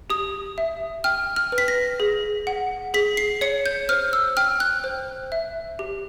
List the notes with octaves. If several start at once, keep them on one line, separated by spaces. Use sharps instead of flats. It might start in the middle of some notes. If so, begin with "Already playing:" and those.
G4 D#6
E5
G5 F6
F6
B4
B6
A#6
G#4
F#5
G#4 B6
C7
C#5 C#7
G6
C5 F6
E6
G5 F6
F#6
C5
E5
G4